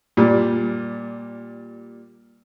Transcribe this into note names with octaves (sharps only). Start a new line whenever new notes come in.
A#2 G3